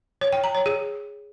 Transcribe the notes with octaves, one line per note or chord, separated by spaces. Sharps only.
C#5
G5
A#5
C#5
G#4